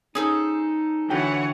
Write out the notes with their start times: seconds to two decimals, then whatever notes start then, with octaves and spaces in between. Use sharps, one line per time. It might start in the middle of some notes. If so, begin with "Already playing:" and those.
0.15 C#4 D#4 G#4 A4 C5
1.10 D3 E3 F#4 C#5 F#5 G5